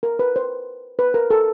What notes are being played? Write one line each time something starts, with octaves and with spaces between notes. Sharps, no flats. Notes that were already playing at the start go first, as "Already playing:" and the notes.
A#4
B4
C5
B4
A#4
A4